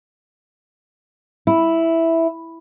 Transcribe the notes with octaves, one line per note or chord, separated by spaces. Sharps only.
E4